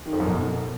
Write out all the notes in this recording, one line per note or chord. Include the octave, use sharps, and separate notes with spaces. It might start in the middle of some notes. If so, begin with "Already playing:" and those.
D#3
F2
F#2
B2